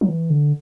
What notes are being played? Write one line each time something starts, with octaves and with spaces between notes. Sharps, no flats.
F#3
E3
D3